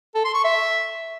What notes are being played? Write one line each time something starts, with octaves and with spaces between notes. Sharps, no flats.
A4
C6
C#6
E5